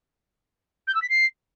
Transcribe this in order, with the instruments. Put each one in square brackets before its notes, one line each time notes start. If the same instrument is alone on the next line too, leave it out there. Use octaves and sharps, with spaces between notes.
[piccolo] G6
E6
B6
C7